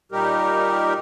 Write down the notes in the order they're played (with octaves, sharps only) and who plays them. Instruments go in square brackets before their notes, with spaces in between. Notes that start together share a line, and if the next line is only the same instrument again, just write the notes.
[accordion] A#2 G3 D#4 G4 A#4